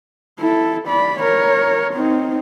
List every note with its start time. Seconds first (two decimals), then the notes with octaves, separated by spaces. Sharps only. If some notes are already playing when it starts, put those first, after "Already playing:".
0.40 E4 A4
0.87 D5 B5
1.19 A#4 C#5
1.94 C4 D#4